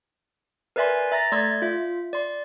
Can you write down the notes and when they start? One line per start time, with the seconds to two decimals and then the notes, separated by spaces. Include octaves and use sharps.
0.76 A#4 B4 D5 E5 G#5 C6
1.12 E5 A#5 A6 A#6
1.32 A3 D5 C6 E6 G#6
1.62 F4 E5
2.13 D5 C6